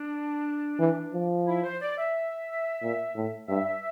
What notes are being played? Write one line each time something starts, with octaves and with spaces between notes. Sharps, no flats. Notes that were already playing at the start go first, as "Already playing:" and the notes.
Already playing: D4
E3
F3
E4
C5
D5
E5
A#2
A2
G2 E5